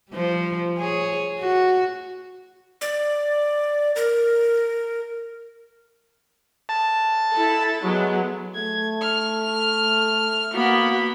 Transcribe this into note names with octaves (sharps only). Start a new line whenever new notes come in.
F3 G3
G#4 C#5
F#4
D5
A#4
A5
E4 A4
F#3 G#3 B3
A3 G#6
F6
A#3 B3 F#4 B5